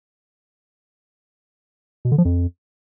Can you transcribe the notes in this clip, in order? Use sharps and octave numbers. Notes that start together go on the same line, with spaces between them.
B2
D3
F3
F2